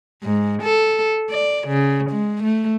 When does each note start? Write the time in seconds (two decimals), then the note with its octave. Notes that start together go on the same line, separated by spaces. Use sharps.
0.23 G#2
0.63 A4
1.30 D5
1.68 C#3
2.11 G#3
2.43 A3